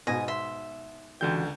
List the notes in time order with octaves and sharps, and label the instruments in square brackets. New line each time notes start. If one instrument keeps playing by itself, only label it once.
[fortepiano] G#2 B2 [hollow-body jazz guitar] B4 [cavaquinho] D#5 G#5
[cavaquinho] E5 C6
[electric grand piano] C#2 D3 G6 [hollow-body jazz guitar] E3 F#4 G5